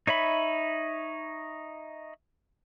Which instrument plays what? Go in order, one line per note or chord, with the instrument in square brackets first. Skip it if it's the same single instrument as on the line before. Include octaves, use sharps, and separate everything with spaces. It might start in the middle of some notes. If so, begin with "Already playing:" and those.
[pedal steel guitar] D#4 C#5 E5 B5